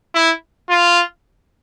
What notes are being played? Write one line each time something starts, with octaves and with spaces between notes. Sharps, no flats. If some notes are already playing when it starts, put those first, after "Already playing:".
E4
F4